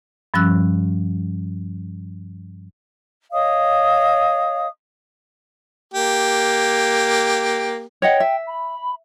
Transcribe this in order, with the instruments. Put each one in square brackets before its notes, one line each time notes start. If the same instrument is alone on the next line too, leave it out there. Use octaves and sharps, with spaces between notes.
[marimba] G2 F3 G3 C#4 E6 F#6
[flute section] C#5 D#5 F5 D#6
[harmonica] A#3 G4
[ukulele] C#5 D#5 F#5 [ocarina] G5
[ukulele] E5
[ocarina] B5